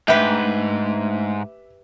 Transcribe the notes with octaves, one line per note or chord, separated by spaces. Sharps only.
G#2 A3 D4 G4 B4 E5